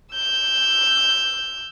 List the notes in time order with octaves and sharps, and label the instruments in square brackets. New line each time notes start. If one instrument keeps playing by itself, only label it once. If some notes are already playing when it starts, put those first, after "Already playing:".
[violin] E6 G6